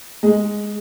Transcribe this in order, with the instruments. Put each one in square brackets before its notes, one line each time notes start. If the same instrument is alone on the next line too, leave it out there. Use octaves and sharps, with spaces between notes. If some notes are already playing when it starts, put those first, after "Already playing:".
[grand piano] G#3